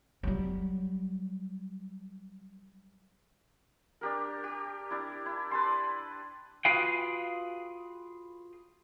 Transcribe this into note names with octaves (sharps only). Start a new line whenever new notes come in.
F#3 G3
D4 G4 A#4
G4
D4 E4
E4
B4 A5 C6
F4 F#4 G#4 B4 F5 G5